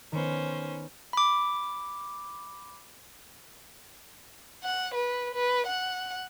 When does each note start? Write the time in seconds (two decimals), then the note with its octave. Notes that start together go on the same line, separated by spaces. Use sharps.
0.12 D#3 B3 C#4 C5
1.13 B5 D6
4.63 F#5
4.95 B4
5.34 B4
5.67 F#5